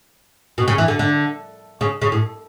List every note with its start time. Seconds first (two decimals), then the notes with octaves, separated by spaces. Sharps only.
0.58 B2
0.68 C#3
0.78 E3
0.88 D3
0.99 D3
1.81 C#3
2.02 C#3
2.12 A2